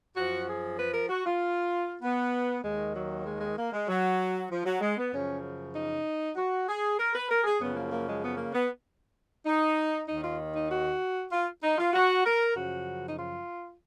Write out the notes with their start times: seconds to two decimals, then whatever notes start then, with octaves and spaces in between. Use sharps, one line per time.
0.16 F#2 F3 F#4
0.47 G#4
0.78 B4
0.93 A#4
1.09 F#4
1.25 F4
2.02 B3
2.64 D#2 D#3 G#3
2.95 F#3
3.26 G#3
3.41 G#3
3.57 A#3
3.73 G#3
3.88 F#3
4.50 F3
4.66 F#3
4.81 G#3
4.97 B3
5.11 F#2 C#3 F3 C#4
5.74 D#4
6.36 F#4
6.68 G#4
6.99 A#4
7.14 B4
7.29 A#4
7.44 G#4
7.60 F#2 C#3 F3 B3
7.76 A#3
7.91 A#3
8.07 G#3
8.22 B3
8.38 A#3
8.53 B3
9.46 D#4
10.08 D#2 D#3 D#4
10.23 F4
10.54 D#4
10.70 F#4
11.32 F4
11.62 D#4
11.78 F4
11.94 F#4
12.25 A#4
12.56 F#2 C#3 F3 F#4
13.09 D#4
13.18 F4